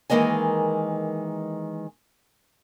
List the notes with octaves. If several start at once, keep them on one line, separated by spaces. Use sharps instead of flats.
D#3 E3 G#3 A#3 D#5 G#5